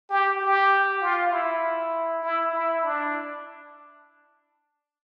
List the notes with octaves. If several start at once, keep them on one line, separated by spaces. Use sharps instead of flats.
G4
G4
F4
E4
E4
E4
D4